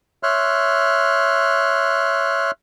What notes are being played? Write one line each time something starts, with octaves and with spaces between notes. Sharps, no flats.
C#5 E5 C6 F6 F#6